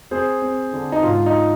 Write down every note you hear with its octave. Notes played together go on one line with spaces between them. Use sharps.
C4 G#4 C5
C4
D3
D#4
G#2 F4
D#4